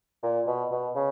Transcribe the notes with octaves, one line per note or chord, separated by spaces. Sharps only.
A#2
B2
B2
C#3